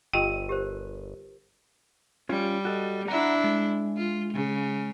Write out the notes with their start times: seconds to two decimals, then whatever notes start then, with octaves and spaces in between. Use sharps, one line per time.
0.13 G1 F4 G4 D#5 G5 E6 D#7
0.49 G4 A#4 C5
2.29 G3 C#4 F4
2.65 F#4 A4 D#5
3.08 D4 E4 F#5 A#5
3.44 G#3
3.97 F4
4.33 C#3